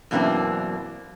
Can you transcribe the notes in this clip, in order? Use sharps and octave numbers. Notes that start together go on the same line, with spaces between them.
F#2 B2 E3 A#3 C4 D4